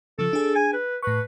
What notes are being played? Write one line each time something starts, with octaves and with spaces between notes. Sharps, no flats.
C#3 F3 A4
D4 G#4
G#5
B4
A2 B4 C#6